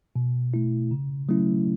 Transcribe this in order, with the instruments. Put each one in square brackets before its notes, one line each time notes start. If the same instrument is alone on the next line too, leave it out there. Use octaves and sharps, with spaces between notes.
[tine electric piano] B2
A3 E4
C#3
F#3 A3 C#4 E4